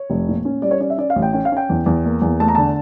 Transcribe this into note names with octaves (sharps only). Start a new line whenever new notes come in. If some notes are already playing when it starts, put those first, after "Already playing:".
Already playing: C#5
F1
A#2
C#4
G3 D5
C#5
C#4 D5
E5
C#4 D5
F5
A1
G5
C#4 G5
F5
C#4 G5
E2
E2
A#3
E2
A3 A5
A#5
D3 A5